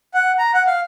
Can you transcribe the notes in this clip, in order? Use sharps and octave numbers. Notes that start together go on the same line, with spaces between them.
F#5
A#5
F#5
F5